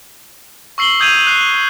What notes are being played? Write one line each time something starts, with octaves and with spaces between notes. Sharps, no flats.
C#6 E6 C7 F#7 G7
D#6 G6 G#6 D#7 F7
F#6 C7